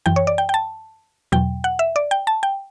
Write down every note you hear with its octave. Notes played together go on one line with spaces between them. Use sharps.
F#2 E3 G5
C#5
D5
G5
G5
A5
E2 B2 F#3 G5
F#5
E5
D5
G5
A5
G5